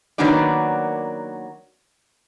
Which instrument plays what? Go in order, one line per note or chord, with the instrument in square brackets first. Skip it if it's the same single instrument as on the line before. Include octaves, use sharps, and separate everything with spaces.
[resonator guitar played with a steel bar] D#3 F#3 A#3 B3 D4 D5